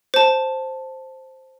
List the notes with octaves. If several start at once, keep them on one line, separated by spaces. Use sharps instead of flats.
C5 A5